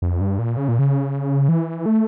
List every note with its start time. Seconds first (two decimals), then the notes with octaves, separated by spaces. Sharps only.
0.02 F2
0.21 G2
0.39 A#2
0.57 C#3
0.68 A#2
0.79 C#3
1.49 E3
1.86 A3